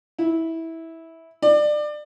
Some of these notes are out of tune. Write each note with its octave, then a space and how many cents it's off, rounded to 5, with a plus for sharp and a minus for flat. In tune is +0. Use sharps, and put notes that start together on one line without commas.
E4 -15
D5 +25